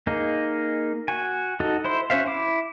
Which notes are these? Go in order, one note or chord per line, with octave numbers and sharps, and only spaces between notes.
A#3 D#4 G#4
F#4 G#5
D#4 F#4 A4
E4 C5 C6
C#4 F#4 C5 E5 F5
E4 D6